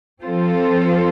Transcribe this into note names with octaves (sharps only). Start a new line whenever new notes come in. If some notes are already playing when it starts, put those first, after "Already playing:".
F3 C4 F4 A4 C5